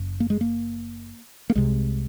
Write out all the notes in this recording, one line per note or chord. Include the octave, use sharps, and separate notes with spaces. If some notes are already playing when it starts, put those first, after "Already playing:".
Already playing: F#1 F#2
A#3
G#3
A#3
A#3
C2 C3 G#3